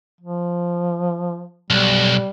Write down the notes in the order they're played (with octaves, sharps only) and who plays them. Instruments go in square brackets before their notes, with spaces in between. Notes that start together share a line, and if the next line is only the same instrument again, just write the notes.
[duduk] F3
[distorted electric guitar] B1 [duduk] G3